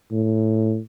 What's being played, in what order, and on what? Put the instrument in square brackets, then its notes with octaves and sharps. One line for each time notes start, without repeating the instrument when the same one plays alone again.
[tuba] A2